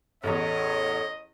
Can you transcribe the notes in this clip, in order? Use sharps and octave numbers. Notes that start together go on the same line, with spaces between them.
A1 E2 A4 C#5 D#5